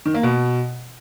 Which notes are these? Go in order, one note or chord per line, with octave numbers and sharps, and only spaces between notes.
D#3
A#3
B2